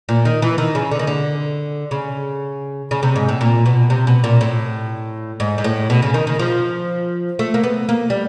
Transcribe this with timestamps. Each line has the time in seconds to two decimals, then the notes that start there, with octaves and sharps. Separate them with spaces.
0.09 A#2
0.25 D#3
0.42 E3
0.58 D#3
0.75 C#3
0.91 D3
0.99 D#3
1.07 D3
1.91 C#3
2.91 C#3
3.03 C3
3.16 G#2
3.28 A2
3.41 A#2
3.66 B2
3.90 C3
4.07 B2
4.24 A#2
4.41 A2
5.40 G#2
5.58 G#2
5.64 A2
5.90 B2
6.02 C#3
6.14 D#3
6.27 D#3
6.39 F3
7.39 A3
7.54 A#3
7.64 B3
7.89 A#3
8.10 G3